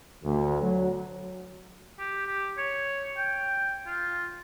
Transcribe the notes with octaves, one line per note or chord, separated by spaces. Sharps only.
D2
F#3
G4
G4
C#5
G5
F4